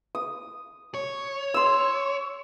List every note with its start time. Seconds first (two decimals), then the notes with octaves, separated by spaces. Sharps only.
0.15 D#6
0.94 C#5
1.54 C6 E6